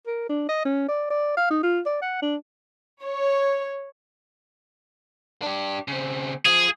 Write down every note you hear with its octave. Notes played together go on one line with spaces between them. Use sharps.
A#4
D4
D#5
C#4
D5
D5
F5
D#4
F4
D5
F#5
D4
C#5
D4 G4
C#3 C4
F3 F4 G#4